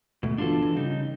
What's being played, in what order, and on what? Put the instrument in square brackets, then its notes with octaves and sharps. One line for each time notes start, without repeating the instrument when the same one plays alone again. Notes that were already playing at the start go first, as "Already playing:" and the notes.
[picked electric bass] D#2 G#2 A3 [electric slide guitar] B2
[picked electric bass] G1 B2 E3 [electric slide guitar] D4 F4 A4
[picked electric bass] E3
[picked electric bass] C#3 G3 [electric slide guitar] D#4